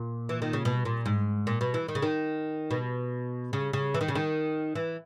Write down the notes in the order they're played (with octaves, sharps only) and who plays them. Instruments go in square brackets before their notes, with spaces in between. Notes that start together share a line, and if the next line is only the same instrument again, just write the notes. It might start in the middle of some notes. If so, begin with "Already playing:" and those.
Already playing: [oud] A#2
E3
D#3
C#3
B2
A#2
G#2
A#2
B2
E3
D#3
C#3
D#3
B2
C#3
C#3
E3
D#3
C#3
D#3
E3